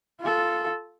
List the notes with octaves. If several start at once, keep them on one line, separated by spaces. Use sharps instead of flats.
F4 A4